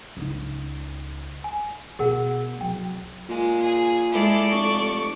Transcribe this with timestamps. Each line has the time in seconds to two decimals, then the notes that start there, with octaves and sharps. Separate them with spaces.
0.17 C#2 D#4
1.44 G#5
1.99 B2 B3 G#4 A#4 F#5
2.61 C2 F#3 G5
3.29 A#2 G#3
3.62 G#4
4.12 G#3 E4 A4 D5
4.51 F1 C#6